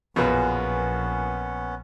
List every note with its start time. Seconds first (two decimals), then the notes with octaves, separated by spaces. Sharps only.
0.16 A#1 F#2 B2 B3 C#4 F4 G#4 B4